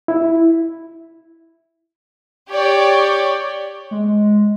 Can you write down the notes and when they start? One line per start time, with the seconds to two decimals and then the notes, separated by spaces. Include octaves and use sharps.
0.08 E4
2.50 G4 C#5 D5
3.91 G#3